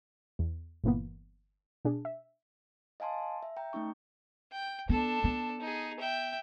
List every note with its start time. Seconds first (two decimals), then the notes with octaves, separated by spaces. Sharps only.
0.39 E2
0.84 G1 A#2 E3 A#3 B3
1.85 B2 D4 G#4
2.05 E5
3.00 D#5 F5 G#5 A5 C6
3.43 E5
3.57 G5 A#5
3.73 A3 C#4 D#4 C#6
4.52 G5
4.89 B3 D4 A4
5.24 B3
5.60 D#4 G#4
6.00 E5 G5